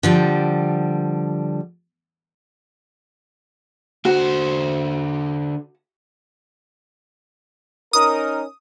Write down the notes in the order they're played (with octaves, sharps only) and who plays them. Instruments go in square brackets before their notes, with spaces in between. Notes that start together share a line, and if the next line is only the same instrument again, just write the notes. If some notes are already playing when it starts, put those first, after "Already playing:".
[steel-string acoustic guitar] D3 F3 G3
[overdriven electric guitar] D3 C5 [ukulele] F#4
[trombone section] C#4 D#4 A#4 [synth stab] D#6